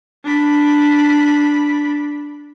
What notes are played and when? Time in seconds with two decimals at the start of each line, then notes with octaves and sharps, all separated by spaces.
0.24 D4 B5